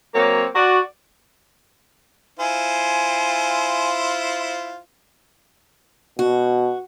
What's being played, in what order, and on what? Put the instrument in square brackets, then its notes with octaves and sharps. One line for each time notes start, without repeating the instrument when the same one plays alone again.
[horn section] F#3 A#3 C4 C#5
F#4 D5
[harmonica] E4 F4 C5 [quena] G#5
[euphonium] B2 [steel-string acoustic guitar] F#4